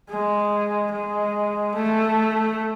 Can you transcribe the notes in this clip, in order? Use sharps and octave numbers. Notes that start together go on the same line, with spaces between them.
G#3
G#3
A3